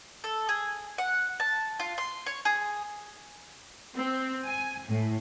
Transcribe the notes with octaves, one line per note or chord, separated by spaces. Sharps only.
A4
G#4
F#5
A5
F4
C6
C#5
G#4
C4
G#5
A2